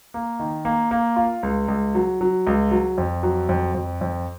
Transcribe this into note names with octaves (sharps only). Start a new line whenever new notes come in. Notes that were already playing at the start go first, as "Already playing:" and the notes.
A#3
D#3
A#3
A#3
F4
C#2
C#2
F#3
F#3
C#2
F#3
F2
F#3
F2
F2
F2